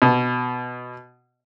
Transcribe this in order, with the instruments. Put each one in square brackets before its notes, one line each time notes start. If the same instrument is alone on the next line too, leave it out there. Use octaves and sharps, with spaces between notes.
[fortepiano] B2